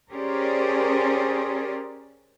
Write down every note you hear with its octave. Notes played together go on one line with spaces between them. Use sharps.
C#4 G4 G#4 A#4 C5 D5